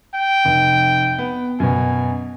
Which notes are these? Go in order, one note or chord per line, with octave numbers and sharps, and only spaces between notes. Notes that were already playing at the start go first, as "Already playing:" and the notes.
G5
F1
B3
F#2 B2 G#5